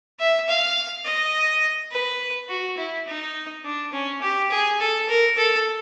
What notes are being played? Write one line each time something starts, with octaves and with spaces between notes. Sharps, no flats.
E5
F5
D#5
B4
F#4
E4
D#4
D4
C#4
G4
G#4
A4
A#4
A4